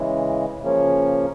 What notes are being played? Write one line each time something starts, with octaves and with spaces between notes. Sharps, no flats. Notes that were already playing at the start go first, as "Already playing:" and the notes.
Already playing: C#3 E3 G#3
C#3 F3 A#3 C#4